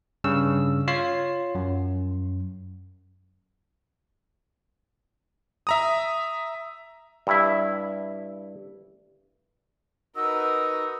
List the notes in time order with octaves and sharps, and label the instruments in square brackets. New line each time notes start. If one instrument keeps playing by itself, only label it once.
[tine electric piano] G2 C#3 E6
F4 C#5 C7
F#2
[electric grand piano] E5 A#5 D#6
[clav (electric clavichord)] G2 E4 E5
[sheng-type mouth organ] D#4 F#4 D#5 [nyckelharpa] A#4 B4 [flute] E6